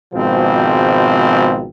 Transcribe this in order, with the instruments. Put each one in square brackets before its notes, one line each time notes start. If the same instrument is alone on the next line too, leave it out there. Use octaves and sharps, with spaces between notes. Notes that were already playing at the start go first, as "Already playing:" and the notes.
[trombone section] G#1 B2 F3 G#3 C4